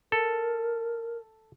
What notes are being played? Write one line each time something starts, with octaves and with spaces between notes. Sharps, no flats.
A4 A#4